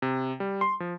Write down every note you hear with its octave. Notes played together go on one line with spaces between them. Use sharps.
C3
G3
C6
F3